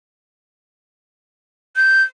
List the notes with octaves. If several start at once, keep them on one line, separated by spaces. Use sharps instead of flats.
G6